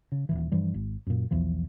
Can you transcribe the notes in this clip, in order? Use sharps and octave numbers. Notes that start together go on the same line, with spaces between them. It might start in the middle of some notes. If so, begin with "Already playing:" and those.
C#3
D#1 G#1 E3
G2 E3 F3 G3
G#1
F#2 A#2
B1 E2 E3 F3